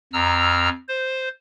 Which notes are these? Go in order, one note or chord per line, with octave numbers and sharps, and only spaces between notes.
F2 A#5 E6 F6
C5